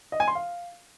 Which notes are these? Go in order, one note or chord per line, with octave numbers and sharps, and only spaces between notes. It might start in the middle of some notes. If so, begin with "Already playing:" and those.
D#5
G#5
C6
F5